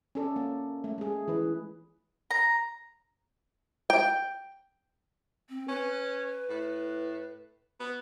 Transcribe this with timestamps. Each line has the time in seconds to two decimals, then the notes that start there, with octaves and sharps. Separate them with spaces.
0.15 C#4 A4 D5
0.36 A#3
0.84 A3
0.98 G#3 G#4
1.28 E3 B4
2.31 A#5
3.90 G5
5.49 C4
5.68 C#4 B4
6.49 A2
7.80 B3